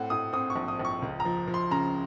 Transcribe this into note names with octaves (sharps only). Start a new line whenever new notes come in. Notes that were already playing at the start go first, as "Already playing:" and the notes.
Already playing: A2 C4 F#5
A2 D#6
C4 D#6
C#6
A#1
D#6
A#1
C#6
C#2
A#5
F3
F3
C6
C#3 A#5